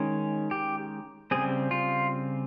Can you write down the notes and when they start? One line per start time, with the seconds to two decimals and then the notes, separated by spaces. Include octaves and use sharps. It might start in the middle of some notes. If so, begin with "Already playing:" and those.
Already playing: D#3 G#3 C#4
0.51 G4
1.31 C#3 G3 C4 G#4
1.71 F4